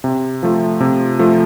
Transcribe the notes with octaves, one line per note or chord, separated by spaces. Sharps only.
C3
F3 A3
C3
F3 A3